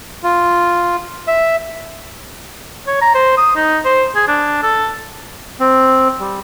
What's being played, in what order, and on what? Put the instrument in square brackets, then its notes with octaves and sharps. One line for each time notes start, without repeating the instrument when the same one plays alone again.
[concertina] F4
E5
[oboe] C#5
A#5
C5
D#6
D#4
C5
G#4
D4
A4
[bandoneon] C4
G3